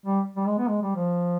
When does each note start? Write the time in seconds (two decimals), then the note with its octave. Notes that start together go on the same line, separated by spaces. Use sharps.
0.06 G3
0.37 G3
0.47 G#3
0.58 B3
0.68 G#3
0.82 G3
0.96 F3